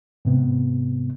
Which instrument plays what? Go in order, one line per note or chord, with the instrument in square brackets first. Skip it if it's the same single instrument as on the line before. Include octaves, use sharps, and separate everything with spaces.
[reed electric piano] G#2 C3 B3